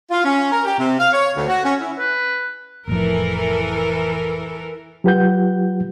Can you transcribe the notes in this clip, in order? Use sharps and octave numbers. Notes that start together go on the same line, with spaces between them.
F4
C#4
A#4
G4
C3
F5
C#5
D2
F#4
C#4
E4
B4
F1 A2 E3 F3 A4 A#4
F#3 F4 G4 B4 F#5 G6